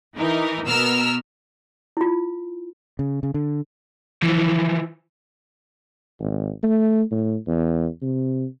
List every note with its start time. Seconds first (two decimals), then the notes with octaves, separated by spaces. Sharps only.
0.16 E3 D#4 A#4
0.67 B2 B3 A#4 E6 F6
1.97 E4 F4
2.99 C#3
3.23 C#3
3.34 D3
4.23 E3 F3
6.20 G#1
6.63 A3
7.11 A2
7.47 E2
8.03 C3